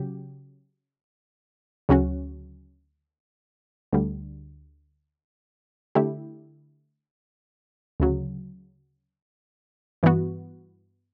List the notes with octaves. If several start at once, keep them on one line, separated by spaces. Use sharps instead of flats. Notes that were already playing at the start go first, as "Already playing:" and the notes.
Already playing: C#3 F#3 G4
D2 C#3 F#3 C#4 F#4
D2 D3 G3
D3 A3 E4 G4
D2 C#3 F#3
G2 E3 B3 F#4